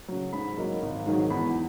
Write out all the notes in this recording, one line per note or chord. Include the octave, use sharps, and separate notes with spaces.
C#3 F#3
G#2 B5
F#3 A#3 D#4
G#1
G#2 D#3 F#3
E2 B5